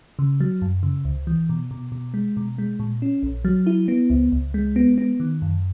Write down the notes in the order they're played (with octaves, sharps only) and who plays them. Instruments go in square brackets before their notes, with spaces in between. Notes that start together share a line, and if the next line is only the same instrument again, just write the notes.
[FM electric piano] C#3
F#3
F#2
C#3
C#2
E3
B2
B2
B2
G#3
B2
G#3
A#2
C#4
A#1
F#3
E4
B3
C#2
C#2
G#3
B3
B3
D#3
F#2